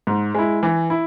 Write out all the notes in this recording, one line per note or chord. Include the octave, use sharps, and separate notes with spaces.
G#2
G#3 E4
E3
E4